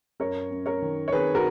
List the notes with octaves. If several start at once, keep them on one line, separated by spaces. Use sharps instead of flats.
F#2 A#4 C#5
F#2
A#4 C#5
D#3
C#5
D#3 G#4 B4
F#4 A#4